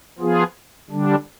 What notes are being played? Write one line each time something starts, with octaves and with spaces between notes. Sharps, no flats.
F3 B3 F4 G#4
D3 G3 D4